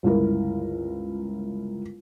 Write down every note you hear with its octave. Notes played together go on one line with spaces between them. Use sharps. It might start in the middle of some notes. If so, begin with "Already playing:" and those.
G1 C#2 E4 A#4